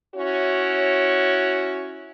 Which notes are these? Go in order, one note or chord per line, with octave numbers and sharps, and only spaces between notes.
C#4 E4 F#4 C#5